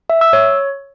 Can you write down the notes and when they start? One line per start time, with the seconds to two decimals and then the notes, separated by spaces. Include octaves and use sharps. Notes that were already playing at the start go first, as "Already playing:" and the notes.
0.10 E5
0.21 E6
0.33 C#5